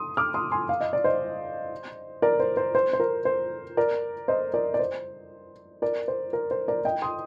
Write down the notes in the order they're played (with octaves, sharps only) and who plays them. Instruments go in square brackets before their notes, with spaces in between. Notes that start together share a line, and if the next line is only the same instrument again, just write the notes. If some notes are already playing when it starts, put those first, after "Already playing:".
Already playing: [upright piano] C6 D#6
D6 F6
C6 D#6
G#5 C6
F5
D#5
D5
C5 D#5
A#4 D5
C5
C5
C5
C5
A#4
C5
A#4 D5
C5 D#5
A#4 D5
D5
C5
A#4 D5
C5
A#4
C5
A#4 D5
D#5 G5
C6 D#6